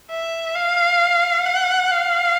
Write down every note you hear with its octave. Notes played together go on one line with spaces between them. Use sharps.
E5
F5
F#5
F5